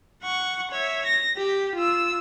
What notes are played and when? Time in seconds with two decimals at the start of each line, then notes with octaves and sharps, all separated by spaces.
0.23 F#5 C#6
0.71 C#5 E5
1.05 A#6
1.37 G4
1.76 F4 E6